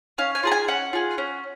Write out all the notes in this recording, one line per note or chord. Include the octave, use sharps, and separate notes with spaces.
C#4 F5
G#5
F4 G#4 A#5
G#5
C#4 F#5
F4 G#4
C#4